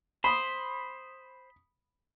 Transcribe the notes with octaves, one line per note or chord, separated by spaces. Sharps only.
C5 B5 D#6